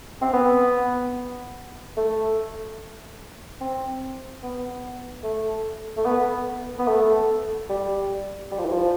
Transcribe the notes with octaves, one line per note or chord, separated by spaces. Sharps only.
C4
B3
A3
C4
B3
A3
A3
B3
B3
A3
G3
G3
F3
E3
F3